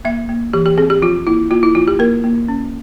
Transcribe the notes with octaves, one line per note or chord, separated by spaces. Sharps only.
A#3 E5
A#3
E3 G4
G4
C4 G#4
G4
F3 F4
A#3 E4
A#3 F4
E4
F3 F4
G4
A#3 A#4
A#3
C#4